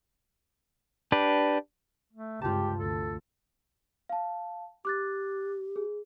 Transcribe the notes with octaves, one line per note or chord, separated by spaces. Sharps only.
D4 G4 B4
A3
C#2 G2 C3 F4 G4 A5
D2 A4
F5 A5
G4 D6 F#6 A6
G#4